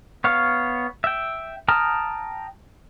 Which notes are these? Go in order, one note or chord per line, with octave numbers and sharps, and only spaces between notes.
B3 C#5 F5
E5 G5
G5 A5 A#5 D#6 F6